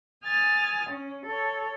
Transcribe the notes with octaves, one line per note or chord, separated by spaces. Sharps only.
G#5 D#6 F6 A6
C#4
A4 C#5